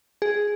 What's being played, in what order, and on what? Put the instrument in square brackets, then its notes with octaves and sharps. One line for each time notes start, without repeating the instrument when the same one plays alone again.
[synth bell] G#4